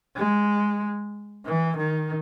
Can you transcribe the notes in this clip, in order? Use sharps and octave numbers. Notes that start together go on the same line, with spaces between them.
G#3
E3
D#3